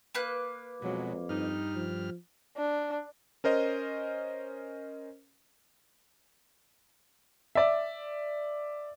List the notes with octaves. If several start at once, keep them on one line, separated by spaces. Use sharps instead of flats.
A#3 B4 F#6
F2 B2 F#3 G#3
G2 D#4 F6
F3
D4
C#4 A#4 C5 D#5
D5 E5